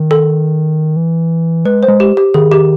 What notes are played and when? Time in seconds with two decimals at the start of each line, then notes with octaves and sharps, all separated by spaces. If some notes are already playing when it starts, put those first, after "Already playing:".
Already playing: D#3
0.11 A4
0.96 E3
1.65 G#3 B4
1.83 C5
1.88 G#3
2.00 G4
2.17 G4
2.34 D#3 G#4
2.52 G4